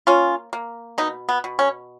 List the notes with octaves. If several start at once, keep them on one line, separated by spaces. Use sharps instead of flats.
A#3 C#4 F4
A#3
B2 B3 D#4
B3
B2
C#4